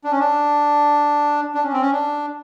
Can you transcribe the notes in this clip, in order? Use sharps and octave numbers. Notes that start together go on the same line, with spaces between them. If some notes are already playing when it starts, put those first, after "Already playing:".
D4
C#4
D4
D4
C#4
C4
C#4
D4